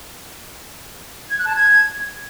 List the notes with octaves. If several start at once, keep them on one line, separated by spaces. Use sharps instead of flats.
G#6
F#6
A5
G#6